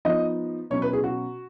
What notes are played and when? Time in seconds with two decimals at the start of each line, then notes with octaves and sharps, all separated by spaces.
0.05 F3 B3 D#4 D#5
0.70 B2 F#3 C#4 C#5
0.82 B4
0.93 G#4
1.04 F#4